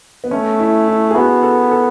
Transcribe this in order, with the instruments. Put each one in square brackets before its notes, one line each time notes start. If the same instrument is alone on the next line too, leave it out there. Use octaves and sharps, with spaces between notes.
[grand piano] B3
[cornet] A3 [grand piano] C#4
[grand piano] E4
E4
G#4
[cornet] B3 [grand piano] F#4
[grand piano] A4
A4